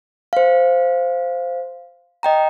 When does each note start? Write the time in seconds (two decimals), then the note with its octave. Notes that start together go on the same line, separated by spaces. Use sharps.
0.33 C5 F5
2.23 D#5 G5 A#5